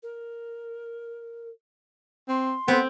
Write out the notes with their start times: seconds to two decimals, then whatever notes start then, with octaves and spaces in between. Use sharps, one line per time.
0.03 A#4
2.29 C4 C6
2.68 B3 C4